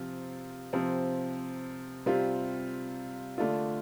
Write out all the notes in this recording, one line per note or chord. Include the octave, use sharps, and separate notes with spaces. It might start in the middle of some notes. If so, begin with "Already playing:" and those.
Already playing: C3 F3 C4 F4
C3 F3 C4
C3 G3 C4 F4
D3 A3 D4 F4